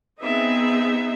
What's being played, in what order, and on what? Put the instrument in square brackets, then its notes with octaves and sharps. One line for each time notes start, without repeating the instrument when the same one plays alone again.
[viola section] B3 C4 D#4 G#4 E5